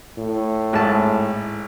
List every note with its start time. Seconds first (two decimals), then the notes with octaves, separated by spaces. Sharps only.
0.19 A2
0.73 G#1 A5